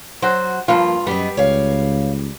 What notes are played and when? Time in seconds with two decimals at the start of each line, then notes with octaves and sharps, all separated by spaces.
0.22 F#3 F#4 C5
0.68 G2 F3 A#3 F4
1.07 F#2 G3 B3 D#5
1.37 C#2 C#5 F5